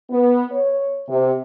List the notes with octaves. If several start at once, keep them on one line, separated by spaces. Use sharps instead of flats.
B3
C#5
C3